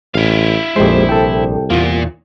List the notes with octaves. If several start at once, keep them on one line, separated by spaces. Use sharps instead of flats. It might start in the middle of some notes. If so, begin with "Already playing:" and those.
A1 E4 F5
A#1 F2 G#3 G4 C5
C2 A4 G5
E2 A#2 A#3 F4